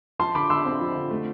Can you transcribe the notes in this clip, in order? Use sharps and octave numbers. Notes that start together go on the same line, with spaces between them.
F3 A5 C6
D3 B5 D6
D3 C6 E6
C4
F3
D3
A3